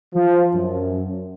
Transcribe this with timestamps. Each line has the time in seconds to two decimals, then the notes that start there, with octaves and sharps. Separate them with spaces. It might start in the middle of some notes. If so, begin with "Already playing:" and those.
0.15 F3
0.54 F#2